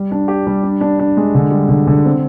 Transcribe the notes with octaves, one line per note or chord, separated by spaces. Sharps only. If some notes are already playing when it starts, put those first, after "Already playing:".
Already playing: G3
D4
G4
G3
D4
D4
D4
G#3
D3
G3
D3
D3
C4